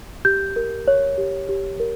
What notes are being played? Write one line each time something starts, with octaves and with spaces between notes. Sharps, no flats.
G4 G6
A#4
C#5
G4
G4
A#4